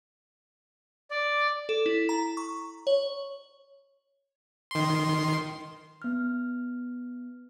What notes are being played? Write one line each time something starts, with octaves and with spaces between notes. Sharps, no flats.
D5
A4
E4
A#5
C#6
C#5
D#3 C6
B3 F6